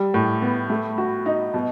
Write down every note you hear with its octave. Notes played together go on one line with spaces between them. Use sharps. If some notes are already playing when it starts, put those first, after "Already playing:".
Already playing: G3
A2
B3
A3
F#4
D#4
B2